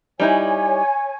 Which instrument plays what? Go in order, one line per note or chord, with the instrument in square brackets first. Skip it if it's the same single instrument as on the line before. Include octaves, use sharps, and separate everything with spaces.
[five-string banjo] G3 D#4 E4 [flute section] C#5 G#5